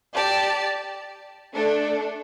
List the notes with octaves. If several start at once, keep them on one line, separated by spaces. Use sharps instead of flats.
G4 D5 A5
A3 D4 A4